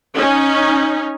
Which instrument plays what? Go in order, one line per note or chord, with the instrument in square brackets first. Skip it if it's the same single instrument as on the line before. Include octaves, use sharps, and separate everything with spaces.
[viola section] C#4 D#4